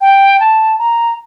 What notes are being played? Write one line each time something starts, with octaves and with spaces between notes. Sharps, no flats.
G5
A5
A#5